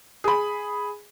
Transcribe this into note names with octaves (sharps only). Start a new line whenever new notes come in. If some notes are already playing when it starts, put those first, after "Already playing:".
G#4 B5